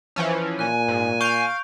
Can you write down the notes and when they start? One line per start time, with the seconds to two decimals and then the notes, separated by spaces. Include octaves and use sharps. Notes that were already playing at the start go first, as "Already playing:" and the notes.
0.16 E3 F3 C#4
0.59 A#2 G#5 F#6
0.88 G#2
1.21 F5 C#6 G6 D7